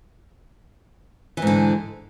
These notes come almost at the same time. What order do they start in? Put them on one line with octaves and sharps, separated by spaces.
E3 G#2 D3